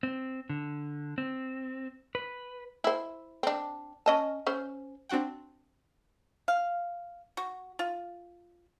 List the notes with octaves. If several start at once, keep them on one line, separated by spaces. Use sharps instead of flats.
C4
D3
C4
B4
E4 C5
C4 D4
C#4 D#5 A5
C#4 C5
C4 D4 F#4 F#5 G5
F5
F#4
F4